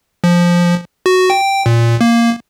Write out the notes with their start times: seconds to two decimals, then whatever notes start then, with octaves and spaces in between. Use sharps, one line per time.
0.24 F3
1.06 F#4
1.30 G5
1.66 A#2
2.01 A#3